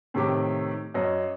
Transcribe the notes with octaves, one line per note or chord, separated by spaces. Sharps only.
A2 C3 D#3 G4 D6
F#2 C#5 D#5